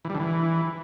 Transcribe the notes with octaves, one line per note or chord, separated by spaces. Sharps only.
E3
G3
D3
E3